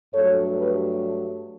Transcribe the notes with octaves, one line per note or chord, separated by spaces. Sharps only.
G2 F#3 A3 A4 C#5
G4 B4